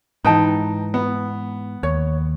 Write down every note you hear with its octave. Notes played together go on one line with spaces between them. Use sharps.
G#2 E3 D#4 B4 G5 A5
B3
D#2 C#5